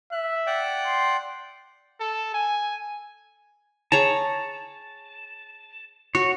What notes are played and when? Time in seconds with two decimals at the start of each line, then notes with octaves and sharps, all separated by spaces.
0.12 E5 F#6
0.47 D5 F#5 G5
0.86 C6
2.00 A4
2.34 G#5
3.92 G#4 C#5 A5 A#5
6.15 F#4 C#5